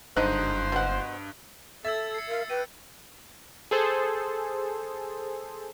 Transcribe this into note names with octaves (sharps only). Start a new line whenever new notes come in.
F#1 G2 D3 D#4 C5 D#5 F#6
B2 F#5
A4 E5 E6 G#6 A6
C7 C#7
A#4 F5
B4 G5 D#7
G#4 A4 C5